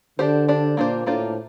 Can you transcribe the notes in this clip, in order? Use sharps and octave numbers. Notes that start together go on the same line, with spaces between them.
D3 D4 G4 C5
D4 G4 C5
A#2 A#3 D4 F4 C5
A2 A#3 D4 F4 C5